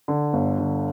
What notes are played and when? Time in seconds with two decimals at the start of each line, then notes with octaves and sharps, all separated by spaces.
0.08 D3
0.33 G1
0.59 D3